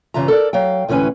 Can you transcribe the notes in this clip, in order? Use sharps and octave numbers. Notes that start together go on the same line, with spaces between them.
G2 C#3 E3 F4 E5 A#5
A4 A#4 D5
F#3 F5 G5
D2 A2 E3 C#4 B4 G#5